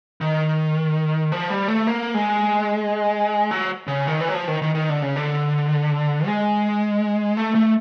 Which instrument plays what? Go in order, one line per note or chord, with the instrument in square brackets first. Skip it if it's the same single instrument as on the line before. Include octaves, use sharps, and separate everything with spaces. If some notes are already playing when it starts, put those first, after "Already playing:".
[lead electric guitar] D#3
F3
G3
A3
A#3
G#3
F#3
C#3
D#3
E3
F#3
F3
D#3
D#3
D#3
D3
C#3
D3
G#3
A3
A3